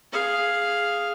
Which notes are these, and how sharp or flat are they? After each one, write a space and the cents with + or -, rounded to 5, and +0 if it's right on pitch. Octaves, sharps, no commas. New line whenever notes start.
G#4 +0 F5 +0